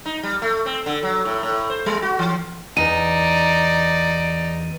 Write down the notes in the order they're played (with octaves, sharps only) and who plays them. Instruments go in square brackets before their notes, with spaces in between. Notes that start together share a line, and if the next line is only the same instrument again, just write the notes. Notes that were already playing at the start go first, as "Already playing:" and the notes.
[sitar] D#4
G3
A3
C4
D3
F#3
A2
A2
C5
G3
F#4
E3
[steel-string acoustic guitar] E2 [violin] D#4 [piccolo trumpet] D5 [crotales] D#7